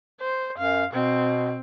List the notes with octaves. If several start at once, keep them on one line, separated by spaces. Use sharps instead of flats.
C5
F#2 F5
B2 C4